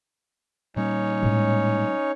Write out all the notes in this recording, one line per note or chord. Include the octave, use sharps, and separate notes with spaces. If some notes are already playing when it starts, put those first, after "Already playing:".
A#2 G3 C#4 D#4 C#5
A2 G#3